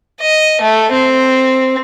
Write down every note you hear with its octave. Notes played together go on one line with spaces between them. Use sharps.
D#5
A3
C4